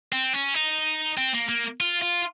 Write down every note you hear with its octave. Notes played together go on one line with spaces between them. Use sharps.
C4
C#4
D#4
C4
A#3
A#3
F4
F4